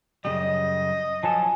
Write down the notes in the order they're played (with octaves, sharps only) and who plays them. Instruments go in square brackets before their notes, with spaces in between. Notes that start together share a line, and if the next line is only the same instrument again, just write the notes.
[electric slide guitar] F#2 C#3 G3 [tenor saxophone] D#5
[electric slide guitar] F3 F#3 A4 [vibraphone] G#5 [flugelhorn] A5